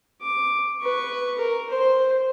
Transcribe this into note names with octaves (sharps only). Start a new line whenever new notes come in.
D6
B4 C#6
A#4
C5